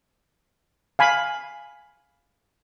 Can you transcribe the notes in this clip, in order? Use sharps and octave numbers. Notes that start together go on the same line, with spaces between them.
F5 G#5 B5